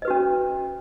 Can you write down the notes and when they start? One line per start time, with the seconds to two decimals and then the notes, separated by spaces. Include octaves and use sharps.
0.02 D#5
0.05 B4
0.08 F#4
0.10 C#4